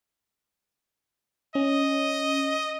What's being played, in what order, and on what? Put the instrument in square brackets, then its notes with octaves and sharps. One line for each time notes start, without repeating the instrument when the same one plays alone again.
[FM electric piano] C#4 [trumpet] D#5